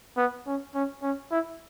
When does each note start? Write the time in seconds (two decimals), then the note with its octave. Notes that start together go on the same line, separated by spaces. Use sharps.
0.17 B3
0.46 C#4
0.75 C#4
1.03 C#4
1.31 E4